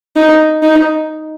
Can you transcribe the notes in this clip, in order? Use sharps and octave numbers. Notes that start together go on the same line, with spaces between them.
D#4
D#4